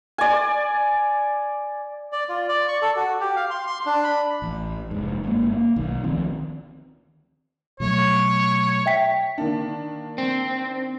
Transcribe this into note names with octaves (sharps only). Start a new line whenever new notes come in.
D5 G#5
D5
F4
D5
C#6
A4
F#4
G4
F5
C6
C6
D4
B5
A1
F1 G#2
G1 G#3 A#3
A#3
B1 D#3
D2 D#3 F3 C4
B2 F#3 A3 C#5
E5 G5 B6
D#3 A#3 D4
C4